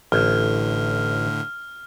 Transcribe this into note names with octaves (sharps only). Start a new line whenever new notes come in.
A1 A2 D3 F6